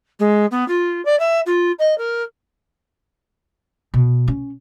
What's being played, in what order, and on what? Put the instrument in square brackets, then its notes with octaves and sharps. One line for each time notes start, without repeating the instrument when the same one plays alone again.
[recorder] G#3
B3
F4
D5
E5
F4
D#5
A#4
[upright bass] B2
C#4